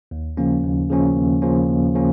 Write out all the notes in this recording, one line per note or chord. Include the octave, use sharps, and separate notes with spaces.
D#2
C#3 F3 A#3 C#4
D#2
C#3 F3 A#3 C#4
D#2
C#3 F3 A#3 C#4
D#2
C#3 F3 A#3 C#4